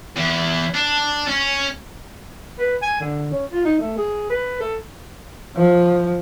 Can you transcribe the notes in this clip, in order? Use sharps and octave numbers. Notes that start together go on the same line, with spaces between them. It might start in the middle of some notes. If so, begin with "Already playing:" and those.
E2
D4
C#4
B4
G#5
D3
C#4
F4
D#4
A3
G#4
B4
A4
F3